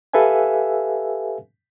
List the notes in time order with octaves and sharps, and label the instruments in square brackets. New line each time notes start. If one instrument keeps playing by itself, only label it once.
[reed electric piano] G4 A4 B4 E5 F5 G#5